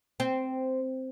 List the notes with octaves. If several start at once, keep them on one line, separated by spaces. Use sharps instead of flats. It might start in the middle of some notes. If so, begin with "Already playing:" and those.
C4